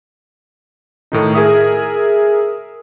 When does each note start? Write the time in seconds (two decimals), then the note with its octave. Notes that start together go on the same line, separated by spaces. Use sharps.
1.12 A2 D#3 D#4
1.35 G#4 A#4 E5 D#6